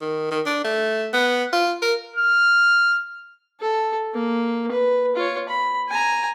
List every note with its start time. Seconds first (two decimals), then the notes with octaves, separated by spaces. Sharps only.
0.01 D#3
0.31 D#3
0.46 D4
0.64 A3
1.13 B3
1.53 F4
1.82 A#4
2.16 F6
3.61 A4
4.15 A#3
4.72 B4
5.16 F4 C#5
5.49 B5
5.90 G#5 A#5